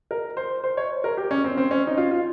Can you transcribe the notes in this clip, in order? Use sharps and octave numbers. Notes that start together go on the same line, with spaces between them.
A#4
C5
C5
C#5
A#4
G4
C#4
C4
C4
C#4
D#4
F4
F4